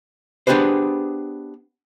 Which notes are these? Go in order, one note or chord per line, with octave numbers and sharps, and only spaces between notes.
B3 D4 G4 G#4 B4 C5